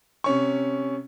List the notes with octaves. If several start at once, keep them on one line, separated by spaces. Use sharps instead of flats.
C3 C#4 C#6